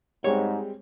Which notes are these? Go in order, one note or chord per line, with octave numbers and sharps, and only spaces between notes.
G#2 G3 G#3 C4 C#5